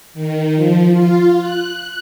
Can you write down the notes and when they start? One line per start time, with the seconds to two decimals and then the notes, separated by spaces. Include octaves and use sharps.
0.14 D#3
0.55 F3
0.91 F4
1.39 F#6